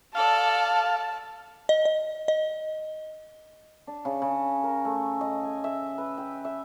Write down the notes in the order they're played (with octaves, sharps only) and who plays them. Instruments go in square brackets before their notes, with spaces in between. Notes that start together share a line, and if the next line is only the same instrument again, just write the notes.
[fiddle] A4 D5 [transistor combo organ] F5 [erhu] A5
[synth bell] D#5
D#5
D#5
[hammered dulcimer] D4
C#3
C#3
A#4
A3
D#5
G#5
E5
B4
G5
E5